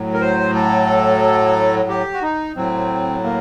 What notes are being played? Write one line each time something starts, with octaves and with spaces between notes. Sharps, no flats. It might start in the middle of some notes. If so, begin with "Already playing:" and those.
Already playing: A2 F#3
A#4
C5
A4
G4
F#4
D#4
A2 F#3 C4
A#3